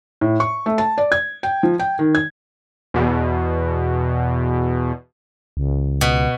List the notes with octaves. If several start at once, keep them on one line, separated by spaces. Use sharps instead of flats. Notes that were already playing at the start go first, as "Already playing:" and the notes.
A2
C#6
A3
A5
D5
G#6
G5
F3
G5
D#3
G#6
E2 B2
C#2
B2